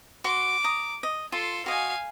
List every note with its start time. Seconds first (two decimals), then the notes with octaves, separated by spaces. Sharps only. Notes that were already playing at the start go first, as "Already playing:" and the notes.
0.24 F#4 C6 D6
0.64 A#5 D#6
1.03 D#5
1.32 F4 A4 C6
1.66 F#4 D#5 F5 G#5